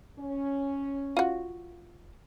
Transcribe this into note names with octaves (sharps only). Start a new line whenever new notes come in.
C#4
F4 F#4